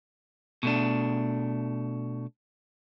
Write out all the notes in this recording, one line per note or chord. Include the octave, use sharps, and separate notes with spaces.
B2 A3 D4